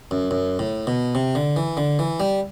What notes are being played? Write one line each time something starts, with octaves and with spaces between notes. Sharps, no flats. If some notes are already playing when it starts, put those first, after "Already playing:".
F#2
F#2
A2
B2
C3
D3
E3
D3
E3
G3